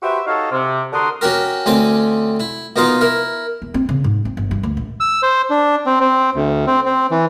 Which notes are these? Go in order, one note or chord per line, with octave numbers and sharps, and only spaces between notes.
F#4 G4 B4 C5 E5
D#4 F#4 A4 C#5 D#5 F5
C3
D3 D4 F#4 A#4 C6 D#6
C#4 F#4 G4 A#4
D2 C4 C#4 G#5 D6
E4
B2 A#3 D#4 F4 F5 A#5
E4 A#4
E2
C4
C#3
G#2
C4
G1
G2
D2
A#1
E6
C5
D4
C4
C4
D2
C4
C4
E3